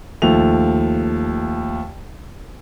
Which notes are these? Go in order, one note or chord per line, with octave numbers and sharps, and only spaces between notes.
D#2 F3 A3 F7